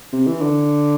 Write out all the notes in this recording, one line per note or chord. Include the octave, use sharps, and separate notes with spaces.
C3
E3
D3